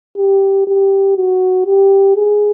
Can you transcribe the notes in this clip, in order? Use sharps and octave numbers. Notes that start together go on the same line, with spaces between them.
G4
G4
F#4
G4
G#4